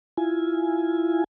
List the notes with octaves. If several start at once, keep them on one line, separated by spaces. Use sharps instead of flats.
E4 F4 G#5